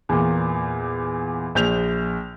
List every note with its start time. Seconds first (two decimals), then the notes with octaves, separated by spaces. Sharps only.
0.09 E2 A#2
1.55 A#1 G6 F7